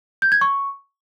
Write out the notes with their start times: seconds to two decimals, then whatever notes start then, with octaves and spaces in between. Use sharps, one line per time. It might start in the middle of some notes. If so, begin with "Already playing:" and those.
0.22 G6
0.32 G#6
0.41 C#6